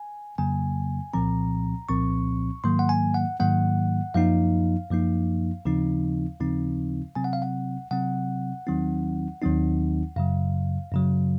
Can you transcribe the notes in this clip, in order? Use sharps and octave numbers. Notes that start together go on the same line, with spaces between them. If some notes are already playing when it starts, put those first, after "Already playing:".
Already playing: G#5
F2 C#3 F#3 A#3 G#5
C2 A#2 F3 C4 A#5
C2 A#2 F3 C4 C#6
G#2 D#3 F#3 A#3 C6
F#5
G#5
F#5
G#2 D#3 F#3 A#3 F#5
F#2 F3 A#3 D#4 F5
F#2 F3 A#3 D#4
D#2 C#3 F3 C4 D#4
D#2 C#3 F3 C4 D#4
C3 F#3 C4 G#5
F#5
F5
F#5
C3 F#3 C4 F#5
D#2 D#3 F#3 C4 D#4
D#2 D#3 F#3 C4 D#4
F#2 C#3 F#3 F5
F#2 C#3 F#3